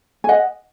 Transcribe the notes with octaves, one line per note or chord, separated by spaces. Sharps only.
G#5
D#5 F#5